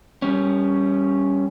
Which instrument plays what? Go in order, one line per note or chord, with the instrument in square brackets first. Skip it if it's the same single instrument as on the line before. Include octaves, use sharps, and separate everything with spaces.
[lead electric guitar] G3 C#4